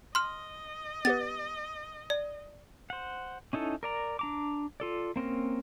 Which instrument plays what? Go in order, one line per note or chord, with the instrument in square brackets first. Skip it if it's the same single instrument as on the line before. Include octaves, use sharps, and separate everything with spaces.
[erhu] D#5 [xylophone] C6 F6
[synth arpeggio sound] B3 G4 B4 [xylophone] A6
[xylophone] D5
[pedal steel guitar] C5 F#5
C#4 D#4 E4 A4
A#4 D5 A#5
D4 A#5 D6
F4 A4 D5
A#3 C4 C#4 A#4